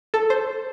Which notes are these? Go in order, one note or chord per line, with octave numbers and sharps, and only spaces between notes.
A4
C5